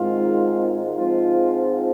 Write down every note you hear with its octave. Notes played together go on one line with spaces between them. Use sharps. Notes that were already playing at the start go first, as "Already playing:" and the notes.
Already playing: G#1 G#2 D#3 G#3 C4 F4
G#2 F3 G#3 C4 F4